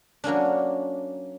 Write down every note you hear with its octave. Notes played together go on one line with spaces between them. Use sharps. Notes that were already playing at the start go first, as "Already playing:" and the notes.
F#3 A#3 C#4 D4